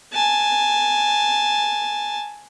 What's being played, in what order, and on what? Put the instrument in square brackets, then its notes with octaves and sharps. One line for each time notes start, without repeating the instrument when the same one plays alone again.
[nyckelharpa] G#5 A5